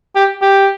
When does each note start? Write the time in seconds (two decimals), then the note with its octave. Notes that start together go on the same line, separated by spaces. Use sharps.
0.15 G4
0.42 G4